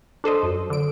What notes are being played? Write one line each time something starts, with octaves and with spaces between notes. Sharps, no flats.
D4 A4 C5 D#5
F#2
D3 D7